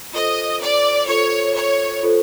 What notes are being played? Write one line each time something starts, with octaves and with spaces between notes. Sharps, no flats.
F4 A4 C5 D#5
D5
F4 A4 C5 C#5
C#5
F4 A4 C5